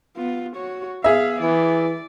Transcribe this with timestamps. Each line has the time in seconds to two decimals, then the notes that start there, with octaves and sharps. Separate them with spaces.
0.16 B3 F4
0.57 F#4 C#5
1.04 B3 G#4 E5 F5
1.42 E3 D5